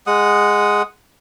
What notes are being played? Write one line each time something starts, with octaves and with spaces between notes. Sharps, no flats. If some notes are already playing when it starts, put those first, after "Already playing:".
G#3 F#5 D#6